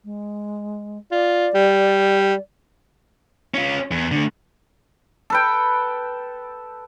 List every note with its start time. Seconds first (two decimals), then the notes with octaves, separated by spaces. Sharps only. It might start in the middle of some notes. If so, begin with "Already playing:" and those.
0.04 G#3
1.11 F4 D5
1.54 G3
3.54 C#4 F4
3.91 E2
4.12 D3 A3
5.30 A4 B4 G5